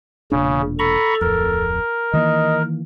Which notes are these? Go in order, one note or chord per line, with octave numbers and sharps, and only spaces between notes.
E1 A#2 C#3 D4
A4 A#5 B5 C#6
D1 F2 A#4
D#3 E3 A#3 D#5